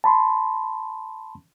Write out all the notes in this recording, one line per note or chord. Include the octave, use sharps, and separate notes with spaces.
A5 B5 C6